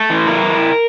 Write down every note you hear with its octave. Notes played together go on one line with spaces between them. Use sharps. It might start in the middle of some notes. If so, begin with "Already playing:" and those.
Already playing: A3
E3
E4 A#4